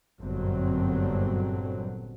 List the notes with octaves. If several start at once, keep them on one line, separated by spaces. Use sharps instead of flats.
G1 F#2 A#2 D3 F#3 C4